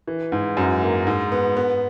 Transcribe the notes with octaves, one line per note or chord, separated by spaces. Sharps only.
E3
G#2
F#2
A#3
G#2
B3
B3